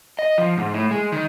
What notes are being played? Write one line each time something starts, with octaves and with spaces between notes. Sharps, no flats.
D#5
F3
G#2
A2
G#3
D#3